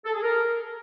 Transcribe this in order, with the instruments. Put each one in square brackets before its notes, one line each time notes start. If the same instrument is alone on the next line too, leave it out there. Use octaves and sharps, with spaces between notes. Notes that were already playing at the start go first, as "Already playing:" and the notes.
[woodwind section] A4
G#4
A#4